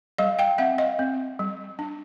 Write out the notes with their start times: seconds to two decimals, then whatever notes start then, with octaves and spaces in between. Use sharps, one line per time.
0.18 G3 D#5 F5
0.39 F5 G5
0.58 C4 E5 F#5
0.78 D#5 F5
0.99 C4
1.39 G3
1.79 D4